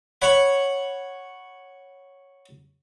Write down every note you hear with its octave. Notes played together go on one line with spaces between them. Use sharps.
C#5 F#5 B5